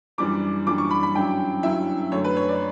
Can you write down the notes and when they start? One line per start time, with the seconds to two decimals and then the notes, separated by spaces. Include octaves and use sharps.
0.18 F#2 E3 G3 D4 D6
0.66 F#2 E3 G3 D4 D6
0.78 C#6
0.90 B5
1.03 B5
1.15 G2 F#3 C#4 E4 G5
1.63 G2 F#3 C#4 E4 E5
2.11 F#2 D3 A3 C#5
2.24 B4
2.36 C#5
2.49 D5